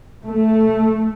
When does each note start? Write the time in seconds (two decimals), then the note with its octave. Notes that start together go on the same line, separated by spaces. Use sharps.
0.24 A3